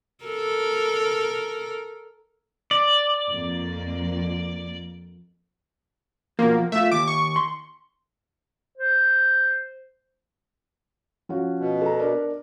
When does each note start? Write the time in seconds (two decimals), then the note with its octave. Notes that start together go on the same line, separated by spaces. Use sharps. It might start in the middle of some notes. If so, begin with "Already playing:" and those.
0.24 A4 A#4
2.71 D5
3.31 F2 A#3
6.39 B2 F3 A#3
6.72 A3 F4 E5
6.92 D#2 D6
7.08 C#6
7.36 C6
8.78 C5
11.29 F3 C#4 F#4
11.59 B2
11.82 A4 A#5
11.99 D4 A#4 D5